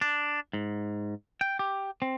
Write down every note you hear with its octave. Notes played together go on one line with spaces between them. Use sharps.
D4
G#2
G5
G4
C4